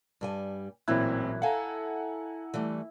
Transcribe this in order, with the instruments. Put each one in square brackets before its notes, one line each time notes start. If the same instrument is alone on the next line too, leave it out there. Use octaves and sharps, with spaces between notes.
[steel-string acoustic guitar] G2 G3 G#5
[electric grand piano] A1 C4 F#6 [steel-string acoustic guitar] A#2 E3 F#3 [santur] E4
[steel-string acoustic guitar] A4 F5 [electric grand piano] F#5 G#5 A#5
[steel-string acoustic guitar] E3 G3 A3